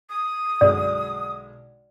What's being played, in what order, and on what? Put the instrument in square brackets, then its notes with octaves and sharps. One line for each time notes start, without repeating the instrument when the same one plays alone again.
[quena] D#6
[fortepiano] B1 D3 G#3 [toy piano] D5